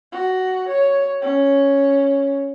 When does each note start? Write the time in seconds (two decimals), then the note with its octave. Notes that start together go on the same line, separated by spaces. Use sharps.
0.12 F#4
0.68 C#5
1.22 C#4